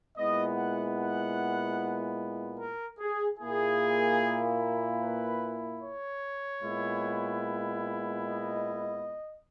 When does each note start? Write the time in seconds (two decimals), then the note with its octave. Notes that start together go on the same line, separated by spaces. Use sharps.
0.16 A#2 G#3 B3 E4 D#5
0.56 F#5
0.97 F#5
2.58 A#4
2.99 G#4
3.39 A#2 A#3 E4 G#4
5.01 B4
5.81 C#5
6.62 A#2 G#3 B3 E4
8.23 D#5